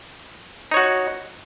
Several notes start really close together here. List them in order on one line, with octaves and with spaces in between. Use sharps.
D#4 C#5 F#4